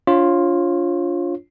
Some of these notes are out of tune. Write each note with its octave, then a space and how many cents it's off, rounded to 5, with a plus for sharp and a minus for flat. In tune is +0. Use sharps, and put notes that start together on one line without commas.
D4 -25 F4 +0 C#5 -30